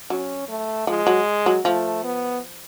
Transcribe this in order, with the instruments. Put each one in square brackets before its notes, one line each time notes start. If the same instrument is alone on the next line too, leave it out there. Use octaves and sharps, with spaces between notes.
[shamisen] F#3 [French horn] C#4
[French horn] A3
[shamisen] F3 [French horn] G#3
[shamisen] F#3
F#3
[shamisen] F3 [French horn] A3
[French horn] B3